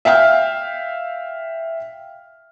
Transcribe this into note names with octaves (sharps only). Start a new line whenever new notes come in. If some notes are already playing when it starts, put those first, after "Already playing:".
E5 F5 G5 F6